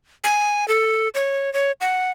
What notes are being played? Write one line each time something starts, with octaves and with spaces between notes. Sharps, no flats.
G#5
A4
C#5
C#5
F#5